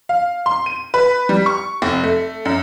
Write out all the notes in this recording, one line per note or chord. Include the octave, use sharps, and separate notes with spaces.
F5
C6
D#7
B4
G3
C#6
F1
A3
F#2